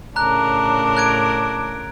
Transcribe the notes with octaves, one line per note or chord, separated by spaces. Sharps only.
A2 C#3 D4 A#4 A#5 F#6
F#6 G#6 D7